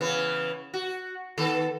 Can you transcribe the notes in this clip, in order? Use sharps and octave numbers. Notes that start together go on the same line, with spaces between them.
C#3 E3 B3
F#4
D#3 B3 A4